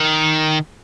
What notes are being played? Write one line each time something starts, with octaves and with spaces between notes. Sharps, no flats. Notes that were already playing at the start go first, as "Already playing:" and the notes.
Already playing: D#3